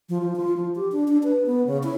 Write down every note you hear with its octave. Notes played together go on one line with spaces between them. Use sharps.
F3
F3
F4
F3
G4
D4
D4
B4
B3
C#3
E4